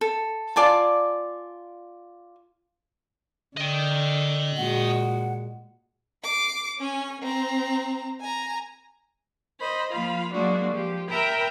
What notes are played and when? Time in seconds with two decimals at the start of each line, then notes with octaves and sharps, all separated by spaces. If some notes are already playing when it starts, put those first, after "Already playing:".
0.01 A4
0.56 F4 D5 G#5 A5
3.57 D3 D#5 G5
4.57 A#2 G#3 F#4 F#5
6.23 D6 C7
6.79 C#4 G#5
7.22 C4 A#5
8.21 G#5 A#5
9.60 C5 D#5 B5
9.91 F3 A#3 F4 F5 B5
10.32 F#3 G#3 A#3 D4 F#4 D5
10.71 F3 G4
11.10 A#4 E5 G5 G#5 A#5 B5